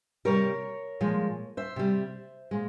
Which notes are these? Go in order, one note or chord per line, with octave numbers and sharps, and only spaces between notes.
C3 G3 A#4 C#5
A#2 F3 G#3
C5 E5
C3 G3
A#2 G#3